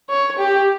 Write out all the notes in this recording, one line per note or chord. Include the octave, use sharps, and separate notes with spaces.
C#5
G4